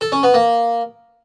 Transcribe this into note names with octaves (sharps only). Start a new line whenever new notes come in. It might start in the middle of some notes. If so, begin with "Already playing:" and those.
A4
C#4
B3
A#3